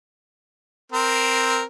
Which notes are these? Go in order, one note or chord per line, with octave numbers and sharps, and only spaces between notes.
C4 A#4